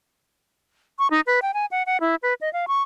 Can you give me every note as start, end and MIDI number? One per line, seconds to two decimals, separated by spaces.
0.99 1.07 85
1.11 1.21 63
1.27 1.40 71
1.42 1.51 79
1.54 1.66 80
1.71 1.83 78
1.86 1.97 78
2.01 2.15 64
2.23 2.34 71
2.41 2.52 75
2.53 2.65 77
2.68 2.83 85